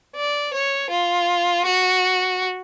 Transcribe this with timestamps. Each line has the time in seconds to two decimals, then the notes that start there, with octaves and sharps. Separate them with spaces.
0.16 D5
0.54 C#5
0.90 F4
1.66 F#4